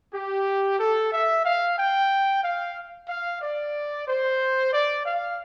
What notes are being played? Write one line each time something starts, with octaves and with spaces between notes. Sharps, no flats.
G4
A4
E5
F5
G5
F5
F5
D5
C5
D5
F5